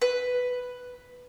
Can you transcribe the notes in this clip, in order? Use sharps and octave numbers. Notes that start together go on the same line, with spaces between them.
B4